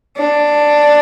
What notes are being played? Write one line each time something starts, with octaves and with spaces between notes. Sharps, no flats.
D4